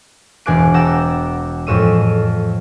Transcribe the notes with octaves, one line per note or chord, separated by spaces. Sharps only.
E1 G#4 G#5 D6 F#6 D7
F#5 G5 A5 A#5 D6 E6
F2 A2 G#3 C#5 E6 D#7